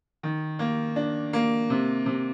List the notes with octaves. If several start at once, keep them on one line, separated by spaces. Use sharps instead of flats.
D#3
A#3
D4
A#3
C3
C3